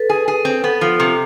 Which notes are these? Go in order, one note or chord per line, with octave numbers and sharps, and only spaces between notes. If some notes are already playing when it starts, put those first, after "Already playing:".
Already playing: A4 B4
G#4
G#4
C4
B3 A4
F3
C3